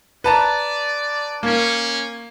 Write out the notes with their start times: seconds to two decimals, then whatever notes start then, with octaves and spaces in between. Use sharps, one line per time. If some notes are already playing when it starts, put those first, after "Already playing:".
0.24 B4 D5 A5 A#5
1.43 A#3 C#4